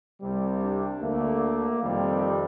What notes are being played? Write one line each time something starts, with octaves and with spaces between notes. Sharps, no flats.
C2 C3 G3
D4
D2 D3 A3 A#3
F2 C3 D#3 G3